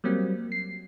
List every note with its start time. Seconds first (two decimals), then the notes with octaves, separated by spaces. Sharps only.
0.04 F#3 G3 A#3 C4
0.52 C7